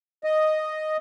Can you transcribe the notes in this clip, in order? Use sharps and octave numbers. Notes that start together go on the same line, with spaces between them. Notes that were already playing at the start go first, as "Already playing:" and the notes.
D#5